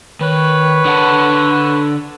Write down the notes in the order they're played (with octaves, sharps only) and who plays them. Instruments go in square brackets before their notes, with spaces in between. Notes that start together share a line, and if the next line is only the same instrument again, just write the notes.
[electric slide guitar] D#3 [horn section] B4 C#5
[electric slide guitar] D3 F#5 A5